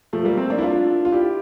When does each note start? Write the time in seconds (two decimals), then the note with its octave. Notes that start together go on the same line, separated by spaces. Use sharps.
0.13 F3 A3
0.25 G3 A#3
0.37 A3 C4
0.50 A#3 D4
0.58 E4
0.62 D4 F4
1.05 F4
1.12 E4 G4